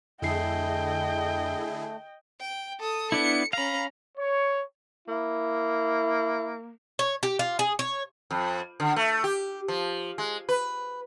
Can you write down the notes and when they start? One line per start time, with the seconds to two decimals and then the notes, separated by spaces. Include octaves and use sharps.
0.22 F2 D3 A3 E4 G#4 D#5 G5 C7
2.40 G5
2.79 A4 D#6
3.12 B3 D4 E4 C#7
3.53 C#4 F5 A#5 B5
4.18 C#5
5.08 A#3 E4
6.99 C#5
7.23 G4
7.39 F4
7.59 G#4
7.79 C#5
8.31 F2
8.80 D3
8.96 A3
9.24 G4
9.68 F3
10.18 G#3
10.49 B4